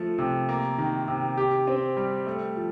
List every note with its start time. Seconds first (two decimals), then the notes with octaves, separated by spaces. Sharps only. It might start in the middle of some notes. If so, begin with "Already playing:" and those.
Already playing: F3 A3
0.18 C3
0.49 A#3
0.78 D#3
1.08 C3
1.37 G4
1.68 C4
1.97 G3
2.27 A3
2.57 F3